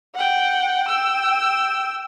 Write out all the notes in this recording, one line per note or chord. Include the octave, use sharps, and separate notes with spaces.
F#5 G5
G5 E6